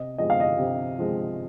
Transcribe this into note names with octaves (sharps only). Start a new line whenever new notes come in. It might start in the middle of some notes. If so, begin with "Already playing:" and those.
Already playing: C3 D#5
F3 G#3 D#5
F5
D#5
C3
F3 G#3